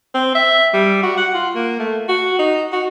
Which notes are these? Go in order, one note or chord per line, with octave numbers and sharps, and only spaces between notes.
C4
E5
G3
F#4
F#5
F4
A#3
A3
F#4
D#4
F#4